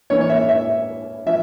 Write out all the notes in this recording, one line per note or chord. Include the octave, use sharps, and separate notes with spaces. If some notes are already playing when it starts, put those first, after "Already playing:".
E3 A#3 C#4 C#5
C#5
E5
E5
F3 E5